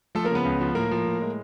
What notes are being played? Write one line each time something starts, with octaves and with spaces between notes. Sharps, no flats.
F3 A3 A4
A#3 A#4
C#3 B3 B4
C#2
F3
A2 A#3 A#4
F3
A2
G#3